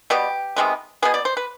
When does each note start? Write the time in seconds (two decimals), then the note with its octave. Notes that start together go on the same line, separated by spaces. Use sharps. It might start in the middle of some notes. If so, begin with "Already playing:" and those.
0.10 B2 G3 B3 G4
0.56 C3 D#3 G#3 B3
1.02 B2 B3 G#4
1.14 D5
1.25 C5
1.37 B4